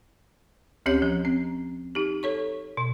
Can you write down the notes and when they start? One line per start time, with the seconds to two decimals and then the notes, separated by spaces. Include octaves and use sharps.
0.86 D2 C4 C#4 G4 C#5 G6
1.02 F3
1.25 C4
1.95 D#4 G4
2.23 A4 C#5 C#6
2.77 B2